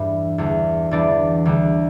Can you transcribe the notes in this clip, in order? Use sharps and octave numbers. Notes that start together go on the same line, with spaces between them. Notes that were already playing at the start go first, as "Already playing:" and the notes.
Already playing: E2 G2 E3 G3
E2 D3 G3
E2 E3 G3 D4 D5
D2 D3 G3